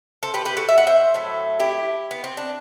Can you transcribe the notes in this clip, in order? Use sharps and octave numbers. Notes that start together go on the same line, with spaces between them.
A4 C5
G4 B4
G4 B4
F#4 A4
E5
F#5
C5 E5
A2 F#3 A3
E4 G4
B3
C4
D4